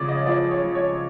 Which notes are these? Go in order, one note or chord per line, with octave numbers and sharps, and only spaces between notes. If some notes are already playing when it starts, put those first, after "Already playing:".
Already playing: C#3 F3 C#5 D5
D#5
F3 D5
C#5
F3
C#5